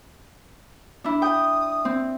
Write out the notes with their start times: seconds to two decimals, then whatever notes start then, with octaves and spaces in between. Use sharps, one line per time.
1.04 D4 E4
1.22 G5 D#6
1.85 C4